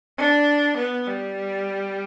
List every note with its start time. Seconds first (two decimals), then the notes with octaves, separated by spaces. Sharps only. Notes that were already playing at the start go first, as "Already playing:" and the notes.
0.18 D4
0.77 B3
1.07 G3